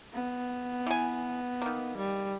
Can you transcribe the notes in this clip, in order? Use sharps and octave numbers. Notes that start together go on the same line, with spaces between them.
B3
E3 G#5
D#3 A#3
G3